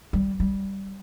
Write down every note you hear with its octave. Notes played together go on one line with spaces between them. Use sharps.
G3
G3